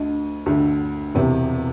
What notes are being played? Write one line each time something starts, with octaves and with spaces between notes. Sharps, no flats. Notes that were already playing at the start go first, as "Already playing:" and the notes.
Already playing: D2 D3 D#5
D2 D3
E1 E2 C3